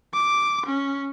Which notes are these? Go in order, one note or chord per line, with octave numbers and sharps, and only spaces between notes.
D6
C#4